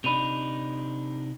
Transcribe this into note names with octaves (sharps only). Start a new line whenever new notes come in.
C3 D4 D#4 B5 D#7 F7